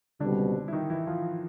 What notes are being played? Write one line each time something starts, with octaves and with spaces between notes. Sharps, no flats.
C#2 B2 D3 G3 C4 D4
E4
D#3 D#4
E3 E4
F3 F4